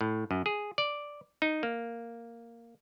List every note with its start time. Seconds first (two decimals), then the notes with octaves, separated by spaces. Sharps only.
0.01 A2
0.31 F#2
0.46 G#4
0.78 D5
1.42 D#4
1.63 A#3